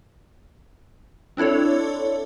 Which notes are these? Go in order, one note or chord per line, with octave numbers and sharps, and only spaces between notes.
C4 D4 E4 A4 C#5